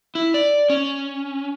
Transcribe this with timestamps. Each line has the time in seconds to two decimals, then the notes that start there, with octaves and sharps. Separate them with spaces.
0.15 E4
0.34 D5
0.70 C#4